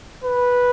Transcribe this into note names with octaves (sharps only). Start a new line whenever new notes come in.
B4